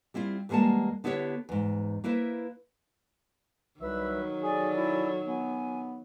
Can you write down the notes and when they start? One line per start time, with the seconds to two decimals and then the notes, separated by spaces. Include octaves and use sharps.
0.14 G3 C4 E4 F4
0.49 E2 G3 G#3 A#3 F#5 A5
1.04 D3 B3 E4 G4 B4 C#5
1.49 E2 G#2
2.04 A#3 E4 B4 C5 E5
3.80 C2 D#3 F#3 B4 E5 E6
4.43 G#4 A4 D5 G#5
4.77 E4
5.27 B3 G#5